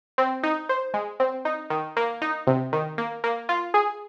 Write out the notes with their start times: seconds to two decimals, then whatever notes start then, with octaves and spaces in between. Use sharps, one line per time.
0.18 C4
0.43 D#4
0.69 C5
0.94 G#3
1.20 C4
1.45 D#4
1.70 D#3
1.97 A#3
2.22 D#4
2.47 C3
2.73 D#3
2.98 A#3
3.24 A#3
3.49 F4
3.74 G#4